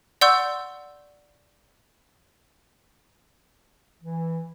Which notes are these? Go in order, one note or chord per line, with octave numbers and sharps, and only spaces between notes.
D5 F#5 C6 C#6 E6 G6
E3